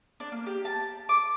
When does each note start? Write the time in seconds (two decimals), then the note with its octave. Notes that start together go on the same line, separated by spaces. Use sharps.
0.20 D4
0.32 A#3
0.46 G4
0.65 A5
1.09 D6